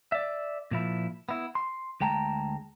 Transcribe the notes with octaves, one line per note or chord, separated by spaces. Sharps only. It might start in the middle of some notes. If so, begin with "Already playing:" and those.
D5 E5
A#2 F3 E4
B3 E4
C6
D2 G#3 G5 A5 A#5